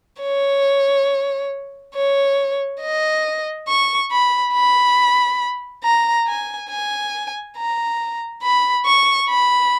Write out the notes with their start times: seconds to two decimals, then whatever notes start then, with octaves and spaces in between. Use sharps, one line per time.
0.22 C#5
1.95 C#5
2.81 D#5
3.68 C#6
4.11 B5
4.53 B5
5.83 A#5
6.27 G#5
6.70 G#5
7.57 A#5
8.43 B5
8.86 C#6
9.29 B5